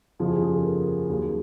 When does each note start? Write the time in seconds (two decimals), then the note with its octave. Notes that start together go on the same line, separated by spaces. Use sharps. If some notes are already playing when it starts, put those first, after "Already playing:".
0.19 F#1 E2 C#3 F3 G#4
0.30 G4
0.42 G#4
0.53 A4
0.64 A#4
1.09 D#2 C#3 F#3